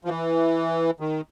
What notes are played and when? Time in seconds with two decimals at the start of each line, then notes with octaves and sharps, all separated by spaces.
0.05 F3
0.08 E3
1.00 D#3